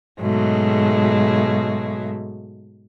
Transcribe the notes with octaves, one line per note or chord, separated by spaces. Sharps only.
G#2 B2 F#3 G#3 A3